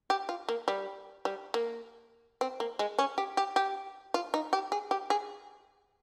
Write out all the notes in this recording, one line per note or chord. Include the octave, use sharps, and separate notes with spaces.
G4
F4
A#3
G3
G3
A#3
C4
A#3
G#3
C#4
G4
G4
G4
F4
D#4
G4
G#4
G4
G#4